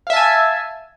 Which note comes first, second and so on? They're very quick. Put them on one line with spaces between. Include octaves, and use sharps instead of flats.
F5 E5 A5 G#5